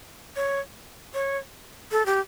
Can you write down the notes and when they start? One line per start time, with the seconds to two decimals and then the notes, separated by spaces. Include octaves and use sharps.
0.36 C#5
1.14 C#5
1.92 A4
2.06 G4